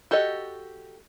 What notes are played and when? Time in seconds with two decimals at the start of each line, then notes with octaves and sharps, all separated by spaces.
0.11 F#4 G4 A4 D#5